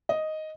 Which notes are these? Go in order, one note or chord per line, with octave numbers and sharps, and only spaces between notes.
D#5